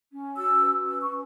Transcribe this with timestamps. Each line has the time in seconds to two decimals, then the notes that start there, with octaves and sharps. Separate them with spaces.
0.12 C#4
0.36 F#4 E6
0.61 B4
0.85 C#4 E6
1.02 C#6
1.10 C#4